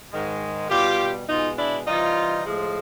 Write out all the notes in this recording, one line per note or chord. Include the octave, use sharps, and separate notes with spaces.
G#2 D#3 G#3
B2 G3 F4 G4
B2 G#3 D#4 F4
D4 E4
C3 E3 G3 D#4 F4
A2 F3 G#3